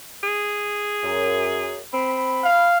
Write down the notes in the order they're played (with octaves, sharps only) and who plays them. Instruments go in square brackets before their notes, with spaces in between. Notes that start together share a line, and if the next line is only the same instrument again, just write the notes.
[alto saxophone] G#4
[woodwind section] F#2
[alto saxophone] C4 [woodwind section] B5
[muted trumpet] F5